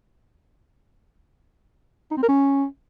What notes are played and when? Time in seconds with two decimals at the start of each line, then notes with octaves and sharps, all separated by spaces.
2.11 D#4
2.17 C4
2.23 A#4
2.29 C#4